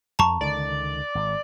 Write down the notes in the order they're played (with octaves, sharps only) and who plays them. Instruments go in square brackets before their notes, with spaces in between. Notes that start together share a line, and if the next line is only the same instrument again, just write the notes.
[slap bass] F2 [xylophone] A5 A#5 C#6
[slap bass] C#2 D3 D#3 [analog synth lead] D5
[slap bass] G#1